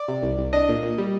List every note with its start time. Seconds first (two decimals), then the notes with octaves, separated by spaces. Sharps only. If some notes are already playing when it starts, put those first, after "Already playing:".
Already playing: D5
0.08 C3
0.22 C2
0.38 C2
0.53 D4 D#5
0.69 A#2
0.83 A#2
0.98 G3